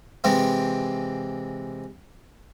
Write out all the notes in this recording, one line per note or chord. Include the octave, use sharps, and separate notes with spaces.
C3 E3 G#3 C4